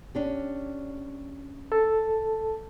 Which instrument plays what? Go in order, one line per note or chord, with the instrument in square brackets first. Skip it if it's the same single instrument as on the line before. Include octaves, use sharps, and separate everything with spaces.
[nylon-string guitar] C#4 D4 G4
[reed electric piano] A4 A5